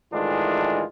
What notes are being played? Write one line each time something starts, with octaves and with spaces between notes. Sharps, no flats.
A2 D#3 E3 G#3 D4 F4